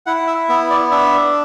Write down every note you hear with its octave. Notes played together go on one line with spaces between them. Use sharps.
E4 F#5
E5
B3 E5
D5
D4 E5